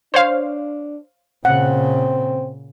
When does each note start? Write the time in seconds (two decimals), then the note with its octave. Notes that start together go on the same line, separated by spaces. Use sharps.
0.14 D4 C5 C#5 F5
1.45 A#2 C#3 C4 F#5